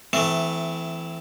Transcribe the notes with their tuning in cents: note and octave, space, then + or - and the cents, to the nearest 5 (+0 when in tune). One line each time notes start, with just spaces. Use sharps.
E3 +10 A3 +0 C4 -30